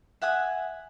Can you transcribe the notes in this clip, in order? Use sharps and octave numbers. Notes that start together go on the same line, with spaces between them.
E5 F#5 G#5 D#6